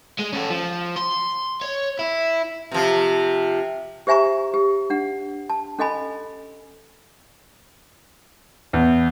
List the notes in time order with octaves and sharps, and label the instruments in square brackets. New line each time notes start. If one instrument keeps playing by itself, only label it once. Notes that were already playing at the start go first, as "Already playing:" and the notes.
[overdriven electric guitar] G#3
C#4 A4
F3
C6
C#5
E4
[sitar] C3 F3
[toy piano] G4 C5 E5 G#5 A#5 C#6
G4
D4 F#5
A5
C#4 A4 D#5 G#5 B5
[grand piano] E2